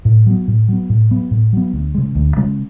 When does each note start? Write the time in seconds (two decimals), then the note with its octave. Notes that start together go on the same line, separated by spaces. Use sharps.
0.05 A2
0.26 F#3 B3
0.48 A2
0.68 F#3 B3
0.90 A2
1.11 F#3 B3
1.31 A2
1.53 F#3 B3
1.73 D2
1.95 C#3 G#3
2.15 D2
2.37 C#3 G#3